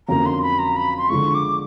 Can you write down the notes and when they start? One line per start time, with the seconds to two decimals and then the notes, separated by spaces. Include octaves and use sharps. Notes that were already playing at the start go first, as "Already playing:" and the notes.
0.08 F2 D3 F#3 A#3 C#4 A#5
0.26 C6
0.42 B5
0.59 A#5
0.76 B5
0.98 C6
1.09 D3 F3 G#3 C#6
1.34 D6